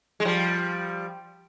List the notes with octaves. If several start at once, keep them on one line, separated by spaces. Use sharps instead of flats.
G#3
F3 G3